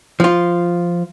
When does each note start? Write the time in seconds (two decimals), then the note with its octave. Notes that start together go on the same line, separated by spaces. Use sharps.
0.20 F3 F4